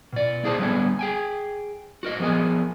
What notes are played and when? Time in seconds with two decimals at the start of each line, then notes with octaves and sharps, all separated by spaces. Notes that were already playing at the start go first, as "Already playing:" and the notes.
0.13 B2 D5
0.43 A#3 E4 G#4 C5 A5
0.58 D3 G3 G#3 B3 C#5 G#5
0.99 G#4 G5 G#5
2.03 F#4 A#4 D#5
2.20 F3 B3 G#4 A#4 G#5